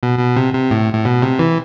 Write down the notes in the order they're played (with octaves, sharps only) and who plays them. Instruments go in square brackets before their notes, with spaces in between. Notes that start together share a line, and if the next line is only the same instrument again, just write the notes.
[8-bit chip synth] B2
B2
C3
C3
A2
A2
B2
C3
E3